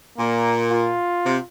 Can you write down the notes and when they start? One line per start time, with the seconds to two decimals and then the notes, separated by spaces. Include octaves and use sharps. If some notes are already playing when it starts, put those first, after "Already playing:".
0.17 A#2 A#3
0.71 F4
1.24 C3